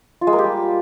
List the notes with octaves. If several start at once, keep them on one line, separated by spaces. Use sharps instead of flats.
F4
G#3
A#3
G4
G3